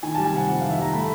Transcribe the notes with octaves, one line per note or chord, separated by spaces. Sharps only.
D#3 G#5
G3 A5
G#5
C3 F#5
F2 F#5
D#3 F5
E5
G3 A#5
A3 B5